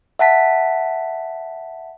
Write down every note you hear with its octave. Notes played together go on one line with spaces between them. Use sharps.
E5 F#5 A5 B6